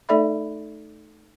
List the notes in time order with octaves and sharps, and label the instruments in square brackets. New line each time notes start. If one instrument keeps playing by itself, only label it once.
[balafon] A3 D#4 A4 D5 E5 B5